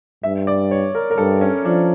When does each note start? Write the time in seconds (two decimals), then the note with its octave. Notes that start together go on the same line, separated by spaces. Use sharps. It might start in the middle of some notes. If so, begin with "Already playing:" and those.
0.23 G2 E5
0.47 D5
0.71 C#5
0.95 A#4
1.11 A#4
1.18 G2 A4
1.41 C#4
1.64 F3 D4